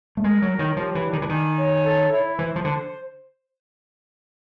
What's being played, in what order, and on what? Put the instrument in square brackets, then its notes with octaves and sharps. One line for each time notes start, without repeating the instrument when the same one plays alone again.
[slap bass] A3
[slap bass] G#3 [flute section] A#4
[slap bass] F#3
[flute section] C#5
[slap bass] D#3
[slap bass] F3 [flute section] G4
[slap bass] E3
[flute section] D4
[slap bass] D#3
E3
[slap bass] D#3 [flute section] G#5
[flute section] C#5
A4
E4
[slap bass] E3 [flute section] C5
[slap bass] F3
[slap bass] D3 [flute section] C5